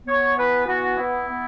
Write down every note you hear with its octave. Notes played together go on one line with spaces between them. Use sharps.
B3 C#5
E3 B4
B3 F#4
B3 E4
B3